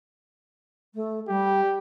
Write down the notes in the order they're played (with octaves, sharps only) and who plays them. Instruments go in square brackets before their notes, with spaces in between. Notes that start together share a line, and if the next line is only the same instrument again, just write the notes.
[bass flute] A3
[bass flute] G3 [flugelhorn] G4